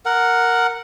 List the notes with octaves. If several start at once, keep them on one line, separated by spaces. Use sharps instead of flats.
A#4 F#5